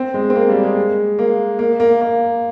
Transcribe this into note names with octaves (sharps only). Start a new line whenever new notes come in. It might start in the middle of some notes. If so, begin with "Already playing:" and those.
Already playing: C4
G#3
C4
A#3
G3
G#3
A#3
A#3
A#3
A#3